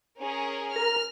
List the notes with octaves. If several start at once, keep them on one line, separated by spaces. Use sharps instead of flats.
C#4 G#4 A#4
A#4 F6